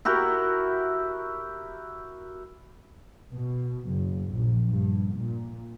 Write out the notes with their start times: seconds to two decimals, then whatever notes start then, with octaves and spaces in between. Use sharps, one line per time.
0.05 E4 F#4 G4 A#4
3.32 B2
3.88 F#1
4.34 A#1
4.70 G2
5.14 A#2